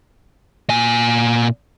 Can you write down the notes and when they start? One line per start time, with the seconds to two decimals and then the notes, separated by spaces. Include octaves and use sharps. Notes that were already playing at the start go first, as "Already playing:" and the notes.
0.70 A#2 G#5